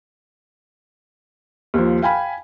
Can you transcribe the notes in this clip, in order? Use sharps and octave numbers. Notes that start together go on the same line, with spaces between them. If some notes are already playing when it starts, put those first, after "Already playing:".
D#2 F3
F5 G5 G#5 B5